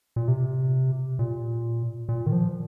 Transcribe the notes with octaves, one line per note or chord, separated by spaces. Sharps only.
A#2
C3
A#2
A#2
D#3
F3